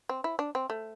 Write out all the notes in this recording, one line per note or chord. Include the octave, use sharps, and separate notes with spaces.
C4
E4
D4
C4
A3